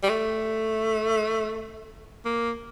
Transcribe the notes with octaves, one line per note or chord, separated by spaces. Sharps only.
G3
A3
A#3